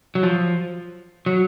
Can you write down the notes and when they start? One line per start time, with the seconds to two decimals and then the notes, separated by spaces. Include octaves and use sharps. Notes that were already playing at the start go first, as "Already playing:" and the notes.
0.15 F#3
0.23 F3
1.26 F#3